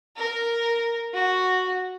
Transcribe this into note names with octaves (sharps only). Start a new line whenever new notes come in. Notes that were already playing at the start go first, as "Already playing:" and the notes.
A#4
F#4